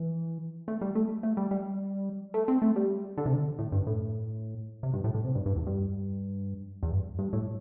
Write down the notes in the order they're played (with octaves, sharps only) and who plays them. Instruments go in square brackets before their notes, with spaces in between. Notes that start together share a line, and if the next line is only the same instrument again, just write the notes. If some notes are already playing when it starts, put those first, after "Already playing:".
Already playing: [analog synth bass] E3
A3
G3
A3
A3
G3
G3
A3
C4
A3
G3
D3
C3
D3
A2
G2
A2
C3
G2
A2
A2
C3
G2
G2
E2
G2
E2
G2
G2
A2